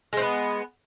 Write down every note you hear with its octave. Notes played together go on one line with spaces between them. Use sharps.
G#3 B3 C4